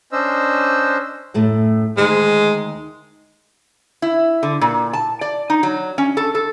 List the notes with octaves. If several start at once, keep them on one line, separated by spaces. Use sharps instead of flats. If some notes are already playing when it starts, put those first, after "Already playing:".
C#4 D4 C5 D#5 E6
F#2 A2 A3
D2 D#3 G#3
E4
D3
A#2
A5
D5
D#4
F#3
C#4
A4
A4